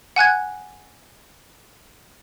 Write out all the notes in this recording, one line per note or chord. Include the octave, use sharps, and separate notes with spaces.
F#5 G#5 F#6 G#6